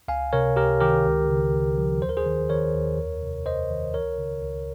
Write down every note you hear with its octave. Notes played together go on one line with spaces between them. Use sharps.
C#2 F5 G#5
C3 A#4 C#5
C#2 G4 A#4
D#3 G4 A#4
C#2
C#3
C#2
F3
D#2 C5
A#4
G#4 C5
D#3
D#3 A#4 C#5
D#2
F2
C3
F2 C5 D#5
D#3
C#2 A#4 C#5
C#3
C#2